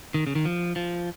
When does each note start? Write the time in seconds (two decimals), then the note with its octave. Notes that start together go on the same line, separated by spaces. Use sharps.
0.14 D#3
0.27 C#3
0.35 D#3
0.45 F3
0.76 F3